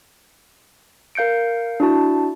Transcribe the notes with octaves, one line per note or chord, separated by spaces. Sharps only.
A#4 F5 G6 C#7 D7
D4 E4 F#4 A5